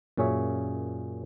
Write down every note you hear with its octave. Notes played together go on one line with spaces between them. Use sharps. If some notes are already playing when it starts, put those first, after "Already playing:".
F#2 A#2 C#4 G#4 C#5 E5